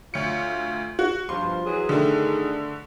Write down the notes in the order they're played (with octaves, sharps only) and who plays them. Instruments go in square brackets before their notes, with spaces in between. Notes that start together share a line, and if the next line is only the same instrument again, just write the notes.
[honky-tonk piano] D2 C#7 [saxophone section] F4 C#5
[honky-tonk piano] F#4
[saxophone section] G2 B2 F3 [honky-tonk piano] C6
[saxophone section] E3 F#3 G#4
[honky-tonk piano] D3 A3 [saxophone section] D#3 G#4